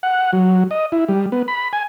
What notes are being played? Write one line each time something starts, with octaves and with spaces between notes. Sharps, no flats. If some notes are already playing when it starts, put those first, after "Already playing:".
F#5
F#3
D#5
E4
G3
B3
B5
G#5